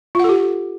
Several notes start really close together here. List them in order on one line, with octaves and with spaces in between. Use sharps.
F4 F#5 A4 G4